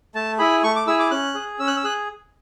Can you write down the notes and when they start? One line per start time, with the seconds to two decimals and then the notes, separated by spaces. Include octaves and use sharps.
0.15 A3 A5
0.39 E4 G#4 B5
0.63 A3 C#6
0.76 D6
0.87 E4 G#4 E6
0.99 D6
1.11 C#4 F#6
1.35 G#4
1.59 C#4 E6
1.67 F#6
1.77 E6
1.84 G#4 F#6